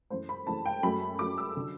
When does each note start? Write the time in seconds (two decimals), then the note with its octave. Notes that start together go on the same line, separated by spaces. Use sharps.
0.10 F#2 E3 A3 C5
0.29 B5
0.47 F#2 E3 A3 A5
0.66 G5
0.83 F#2 F#3 A3 B5
1.19 F#2 F#3 A3 D6
1.38 E6
1.57 D3 F#3